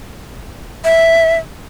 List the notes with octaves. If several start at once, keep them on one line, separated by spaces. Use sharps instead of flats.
E5